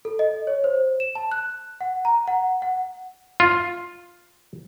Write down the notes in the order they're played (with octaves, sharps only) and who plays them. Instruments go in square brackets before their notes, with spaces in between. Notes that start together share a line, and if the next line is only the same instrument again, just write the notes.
[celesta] A4
D#5
C#5
C5
E7
A5
F#6
F#5
A#5
F#5
F#5
[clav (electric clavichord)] F4